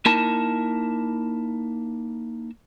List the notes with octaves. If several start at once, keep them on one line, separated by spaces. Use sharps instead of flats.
A#3 D#4 E4 A#4 A5